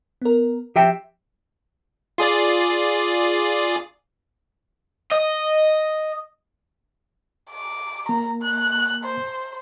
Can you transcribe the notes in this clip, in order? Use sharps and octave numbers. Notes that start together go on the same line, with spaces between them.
B3 A#4
F3 G4 E5 G5
F4 G#4 D5
D#5
D6
A#3 A#5
F#6
C5